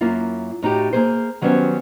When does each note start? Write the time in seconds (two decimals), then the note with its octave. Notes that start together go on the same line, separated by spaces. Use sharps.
0.01 F#2 A#3 E4 F4
0.62 A2 D#4 F#4 G4
0.93 A#3 G#4 C5
1.41 D#3 F#3 G3 B3 C#4 C5